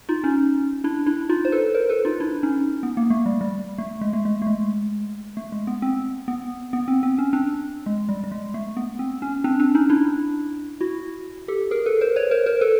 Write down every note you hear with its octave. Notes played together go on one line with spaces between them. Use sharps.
D#4 F4
C#4 D#4
D4 E4
D4 E4
D#4 F4
C5
A4 B4
A#4 C5
A4 B4
D#4 F4
D4 E4
C#4 D#4
B3
A#3
A3
G3
G3
A3
G#3
A3
G#3
A3
G#3
A3
G#3
B3
C4
B3
B3
C4
C4
C#4
C4 D4
G#3
G3
G3
G#3
A3
B3
C4
C#4
C4 D4
C4 D4
C#4 D#4
D4 E4
E4 F#4
G4 A4
G#4 A#4
A4 B4
A#4 C5
B4 C#5
A#4 C5
A#4 C5
A4 B4